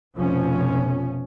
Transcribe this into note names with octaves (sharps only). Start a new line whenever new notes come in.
F1 B2 F3 C#4